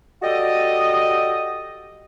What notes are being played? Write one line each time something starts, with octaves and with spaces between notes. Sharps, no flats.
F#4 G4 A4 D5 D#5